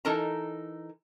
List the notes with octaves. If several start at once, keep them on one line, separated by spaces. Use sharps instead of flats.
E3 D#4 A4 A#4 A5 A#5